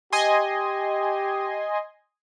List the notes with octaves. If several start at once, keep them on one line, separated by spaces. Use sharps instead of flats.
G4 D#5 G#5 C6